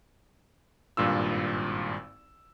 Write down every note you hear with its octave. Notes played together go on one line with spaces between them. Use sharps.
G#1 G2 A#2 F4 E6